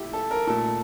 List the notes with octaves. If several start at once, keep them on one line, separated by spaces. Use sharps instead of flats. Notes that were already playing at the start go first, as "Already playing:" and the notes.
Already playing: A#2 A3 E4 G4
A4
A#4
A#2 A3 A4